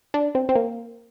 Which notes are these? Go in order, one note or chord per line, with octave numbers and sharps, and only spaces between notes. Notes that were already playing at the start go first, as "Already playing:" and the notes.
D4
C4
C4
A#3